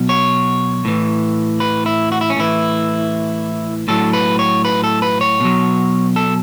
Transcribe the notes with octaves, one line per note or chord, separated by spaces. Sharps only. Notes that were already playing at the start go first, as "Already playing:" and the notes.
Already playing: B2 F#3
C#5
A2 E3
B4
E4
F#4
E4
C#4
A2 E3 E4
A2 F#3 A4
B4
C#5
B4
A4
B4
C#5
B2 F#3
A4